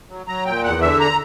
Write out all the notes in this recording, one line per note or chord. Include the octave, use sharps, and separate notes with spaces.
F#3
F#3 A#5
A#2 G5
E2 F#5
D3 E5
A#5